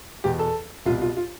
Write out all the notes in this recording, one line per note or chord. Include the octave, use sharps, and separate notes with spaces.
E2 B2 G4
A4
C2 B2 F4
F4
F4